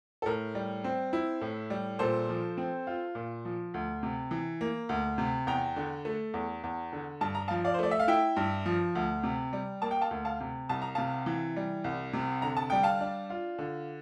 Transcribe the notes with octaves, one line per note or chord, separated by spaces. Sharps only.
A4
A2 A#4
G3
C4
E4
A2
G3
A#2 A4 C5
F3
C4
F4
A#2
F3
D2
C3
E3
A#3
D2
C3
E2 G5 A#5
D3
A3
E2
E2
D3
G2 A5
A#5
F3 F5 A5
D5 F5
C5
A3 D5
E5
F5
E4 E5 G5
G2
F3
D2
C3
G3
A#3 A5
G5
F5 A5
D2
F5 A5
C3
C2 A5
A#5
C3 F5 A5
E3
G3
C2
C3
D3 A#5
A5
G3 G5
F5 A5
D4
F4
D3